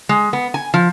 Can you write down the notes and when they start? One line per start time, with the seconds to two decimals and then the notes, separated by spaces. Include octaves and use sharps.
0.09 G#3
0.33 B3
0.54 G#5
0.74 F3